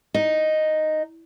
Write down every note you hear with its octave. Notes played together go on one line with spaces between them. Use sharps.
D#4